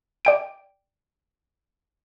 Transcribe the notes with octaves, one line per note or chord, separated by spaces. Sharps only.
D5 G5 D7